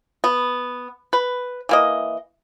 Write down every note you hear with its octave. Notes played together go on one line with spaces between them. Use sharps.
B3
B4
E3 A#3 D#5